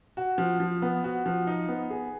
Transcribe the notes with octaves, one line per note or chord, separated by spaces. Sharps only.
F#4
F3
F3
B3
F#4
F3
D#4
B3
G#4